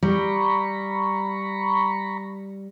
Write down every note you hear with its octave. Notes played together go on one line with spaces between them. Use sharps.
G3 A#5 B5 C#6